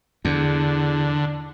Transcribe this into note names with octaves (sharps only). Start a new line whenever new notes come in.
E2 D3